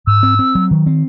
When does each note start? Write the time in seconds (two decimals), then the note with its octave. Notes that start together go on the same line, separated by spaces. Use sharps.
0.07 G#2 E6
0.23 C4
0.39 C4
0.55 F#3
0.71 D#3
0.86 C4